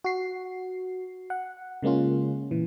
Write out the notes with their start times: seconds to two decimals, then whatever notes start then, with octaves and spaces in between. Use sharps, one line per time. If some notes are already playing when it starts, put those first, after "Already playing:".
0.04 F#4 C7
1.30 F#5
1.83 C#3 G#3 A#3 C#4 F4
2.51 A#2 E3